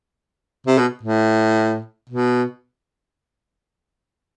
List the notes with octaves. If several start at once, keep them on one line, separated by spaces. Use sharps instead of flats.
C3
B2
A2
B2